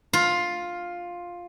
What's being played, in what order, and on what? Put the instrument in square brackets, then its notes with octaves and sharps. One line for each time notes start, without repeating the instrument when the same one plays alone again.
[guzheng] F4